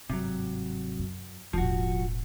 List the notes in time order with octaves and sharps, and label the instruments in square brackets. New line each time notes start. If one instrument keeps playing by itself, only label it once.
[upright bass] G1 G#2 [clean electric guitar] C3 F#3
[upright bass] F#2
[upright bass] E1 A1 [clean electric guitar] F3 F#4